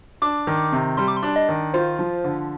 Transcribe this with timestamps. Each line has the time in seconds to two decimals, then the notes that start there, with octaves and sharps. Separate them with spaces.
0.22 D4 D6
0.47 D#3
0.72 C3
0.97 G3 C6
1.08 D6
1.17 C6
1.23 D4
1.36 D#5
1.49 D#3
1.74 F4 C5
1.99 F3
2.24 D3